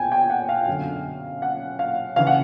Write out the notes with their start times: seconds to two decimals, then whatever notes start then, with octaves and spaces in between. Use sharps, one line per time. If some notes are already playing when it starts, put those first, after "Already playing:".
Already playing: E2 B2 G5 G#5
0.12 G5
0.30 F#5
0.49 F5
0.67 F#2 D3
1.42 F#5
1.79 F5
2.16 C#3 E3 F5
2.27 F#5